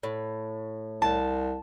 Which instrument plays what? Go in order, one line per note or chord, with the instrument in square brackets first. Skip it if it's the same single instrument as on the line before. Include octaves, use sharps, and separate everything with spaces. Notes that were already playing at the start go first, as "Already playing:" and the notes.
[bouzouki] A2
[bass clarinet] C2 [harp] A5